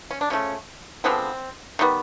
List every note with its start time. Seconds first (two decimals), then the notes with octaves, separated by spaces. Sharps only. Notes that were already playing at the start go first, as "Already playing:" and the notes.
0.11 C#4
0.21 D4
0.30 C#3 F3 A3 C#4
1.04 D3 F3 G#3 B3 C4
1.79 D#3 G3 B3